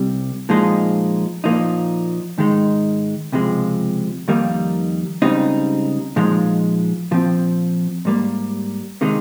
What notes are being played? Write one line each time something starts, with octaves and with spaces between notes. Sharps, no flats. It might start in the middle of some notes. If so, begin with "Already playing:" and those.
Already playing: C2 C3 G3
A#2 F3 G#3 D#4
A#2 F3 A#3 D#4
G#2 D#3 G#3 D#4
C#2 C3 F3 G#3
F2 D#3 G3 A#3 D#4
C#2 C#3 G3 C4 D#4
A#2 F3 G#3 D#4
A#2 F3 C4
G#2 G3 A#3
C3 D#3 G#3 D#4